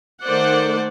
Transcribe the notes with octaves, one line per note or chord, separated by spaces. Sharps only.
D#3 A3 C5 D5 F#5